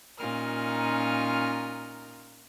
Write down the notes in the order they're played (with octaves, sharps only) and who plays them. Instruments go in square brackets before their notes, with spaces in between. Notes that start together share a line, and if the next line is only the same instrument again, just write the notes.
[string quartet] A#2 C#4 D#4 F4 A#4 F6